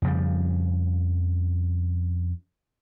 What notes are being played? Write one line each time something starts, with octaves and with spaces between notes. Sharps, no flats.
F2 C#3 F3 G3